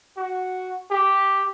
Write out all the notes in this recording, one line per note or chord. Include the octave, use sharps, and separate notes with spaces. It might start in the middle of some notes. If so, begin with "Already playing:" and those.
F#4
G4